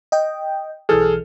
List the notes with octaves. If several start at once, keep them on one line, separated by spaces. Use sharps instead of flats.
D#5 G5
B1 E3 G#4 A4 F6